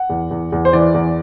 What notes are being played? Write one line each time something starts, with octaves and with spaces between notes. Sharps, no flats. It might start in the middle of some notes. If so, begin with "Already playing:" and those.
Already playing: F#5
E2
E2
E2
C5
E3 D5
E2